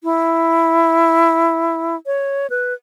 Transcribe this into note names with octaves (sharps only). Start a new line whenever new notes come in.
E4
C#5
B4